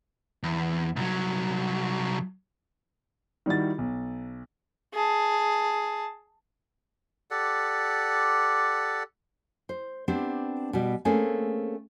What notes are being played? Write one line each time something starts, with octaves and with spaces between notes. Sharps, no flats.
E2
C2 F#3
D#3 G3 E4 F#4 A6
B1
G#4 A5
G4 A4 D5 F#5
C5
B3 C4 D4 G4
B2 G3
A3 A#3 C4 C#4 G#4